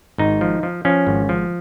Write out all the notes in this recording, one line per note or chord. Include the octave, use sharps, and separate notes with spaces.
G#1 D#4
F3
F3
F3 C#4
G#1
F3